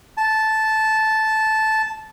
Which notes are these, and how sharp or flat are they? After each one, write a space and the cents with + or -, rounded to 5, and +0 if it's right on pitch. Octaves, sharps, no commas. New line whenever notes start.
A5 -10